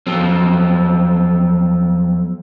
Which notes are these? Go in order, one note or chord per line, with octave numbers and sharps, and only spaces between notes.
E2 F3 F#3 C4